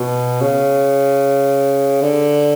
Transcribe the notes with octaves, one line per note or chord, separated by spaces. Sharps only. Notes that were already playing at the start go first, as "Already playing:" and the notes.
Already playing: B2
C#3
D3